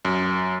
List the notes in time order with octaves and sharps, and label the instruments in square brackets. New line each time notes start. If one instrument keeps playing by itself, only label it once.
[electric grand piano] F#2